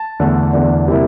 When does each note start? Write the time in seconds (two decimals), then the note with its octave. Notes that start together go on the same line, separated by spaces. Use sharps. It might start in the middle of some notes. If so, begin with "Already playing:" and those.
Already playing: A5
0.20 E2 D3 A3 D4
0.53 E2 D3 A3 D4
0.88 C3 G3 A#3 E4